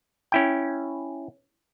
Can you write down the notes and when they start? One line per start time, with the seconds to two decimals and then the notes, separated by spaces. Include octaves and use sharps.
0.32 C#4 E4 G5